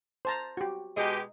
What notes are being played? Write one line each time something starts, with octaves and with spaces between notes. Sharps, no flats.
C5 A5 A#5
F#4 G4
B2 G#3 G4 D#5